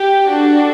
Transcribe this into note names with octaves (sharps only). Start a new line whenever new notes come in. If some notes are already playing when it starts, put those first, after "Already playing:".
Already playing: G4
D4 F#4 A4